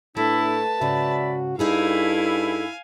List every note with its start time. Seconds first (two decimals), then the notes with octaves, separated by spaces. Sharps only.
0.17 A2 A3 D4 E4 B4 A5
0.81 G#2 C#3 F#4 D5 E5 B5
1.59 G2 D#4 E4 G#4 A4 F5 G#5